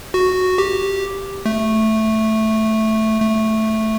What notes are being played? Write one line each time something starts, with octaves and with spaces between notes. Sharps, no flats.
F#4
G4
A3
A3